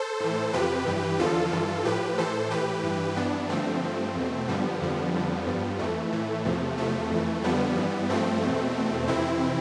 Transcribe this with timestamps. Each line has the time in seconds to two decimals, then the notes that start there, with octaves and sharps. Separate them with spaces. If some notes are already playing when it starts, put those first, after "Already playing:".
Already playing: A4 C5
0.20 A2 E3
0.53 F2 C3 F3 G4 B4
0.86 G2 E3
1.19 E2 D3 F3 F4 A4
1.52 G2 E3
1.85 A2 F3 G4 B4
2.18 A2 E3 A4 C5
2.50 A2 E3 G4 B4
2.83 G2 E3
3.16 G2 E3 B3 D4
3.49 G2 D3 F3 A3 C4
3.83 G2 F3
4.15 E2 B2
4.48 G2 D3 F3 G3 B3
4.81 F2 D3 F3
5.14 F2 D3 F3
5.46 G2 F3
5.79 F2 E3 A3
6.12 A2 E3
6.45 E2 C3 F3
6.78 E2 C3 F3 A3
7.11 F2 E3
7.43 F2 D3 F3 G3 B3
7.77 G2 E3
8.09 G2 F3 A3 C4
8.42 E2 B2
8.76 E2 B2
9.08 F2 C3 E3 C4 E4